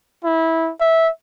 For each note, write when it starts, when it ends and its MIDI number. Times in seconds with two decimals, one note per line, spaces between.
0.24 0.71 64
0.81 1.10 76